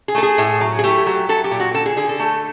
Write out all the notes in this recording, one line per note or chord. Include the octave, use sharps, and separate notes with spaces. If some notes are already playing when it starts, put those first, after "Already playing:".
G#4
A3 A4
G#4
A2
F#3
G#4
A3 G4
F#3
F#3 A4
G4
A#2
F#4
D3 A4
G#4
D3 G#4
A4
A3